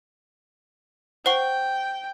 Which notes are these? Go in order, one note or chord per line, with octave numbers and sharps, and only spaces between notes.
C5 F#5 G5 C#6